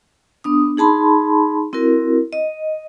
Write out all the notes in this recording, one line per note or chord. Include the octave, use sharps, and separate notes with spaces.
B3 D4 D#6
D#4 G#4 A5 B5 C6
C4 E4 F#4 A#4
D#5